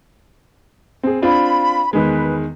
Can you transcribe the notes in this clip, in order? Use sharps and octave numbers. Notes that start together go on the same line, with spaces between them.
C4 G#4
C4 D4 F4 B5
E2 D#3 G#3 B4